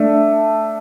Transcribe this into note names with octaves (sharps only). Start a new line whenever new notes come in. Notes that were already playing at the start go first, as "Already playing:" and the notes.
Already playing: A3 D4